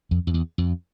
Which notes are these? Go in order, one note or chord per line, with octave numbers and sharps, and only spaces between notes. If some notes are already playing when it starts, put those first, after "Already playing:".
F2
F2
E2
F2